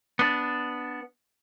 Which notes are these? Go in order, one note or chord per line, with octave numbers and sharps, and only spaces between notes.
B3 D4